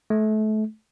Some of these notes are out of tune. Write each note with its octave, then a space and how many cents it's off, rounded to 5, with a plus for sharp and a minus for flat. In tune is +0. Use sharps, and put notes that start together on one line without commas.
A3 -30